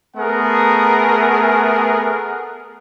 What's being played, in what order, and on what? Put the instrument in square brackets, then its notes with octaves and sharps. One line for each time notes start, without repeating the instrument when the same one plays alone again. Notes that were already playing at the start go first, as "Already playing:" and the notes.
[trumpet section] A3 B3 G#4 A#4 F#5